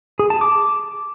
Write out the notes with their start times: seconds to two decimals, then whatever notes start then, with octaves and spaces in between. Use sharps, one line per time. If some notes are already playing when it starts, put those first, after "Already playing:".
0.19 G#4
0.30 A5
0.41 D6